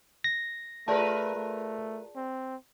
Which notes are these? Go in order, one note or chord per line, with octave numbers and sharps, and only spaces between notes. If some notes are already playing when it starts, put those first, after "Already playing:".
A#6
A3 F4 G#4 A#4 B4 D5 A5
A3
C4